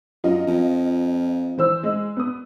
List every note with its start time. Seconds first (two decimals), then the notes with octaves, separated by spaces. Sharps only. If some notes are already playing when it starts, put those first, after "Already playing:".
0.24 F#2 F4 D#5
0.47 F2
1.58 E3 C5 E6
1.83 G#3
2.17 B3 D#6